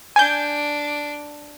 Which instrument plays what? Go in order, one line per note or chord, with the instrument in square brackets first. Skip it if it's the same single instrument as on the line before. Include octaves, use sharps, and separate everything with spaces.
[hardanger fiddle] D4 [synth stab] G#5 G6